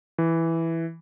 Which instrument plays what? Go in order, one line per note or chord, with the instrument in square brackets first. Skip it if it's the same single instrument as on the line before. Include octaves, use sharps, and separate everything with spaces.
[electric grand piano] E3